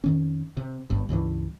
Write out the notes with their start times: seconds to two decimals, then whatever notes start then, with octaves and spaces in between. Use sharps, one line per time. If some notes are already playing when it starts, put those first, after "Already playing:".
0.04 F2 D#3 C#4
0.57 C3
0.90 G1 G2
1.09 C#2 G2 C#3 E3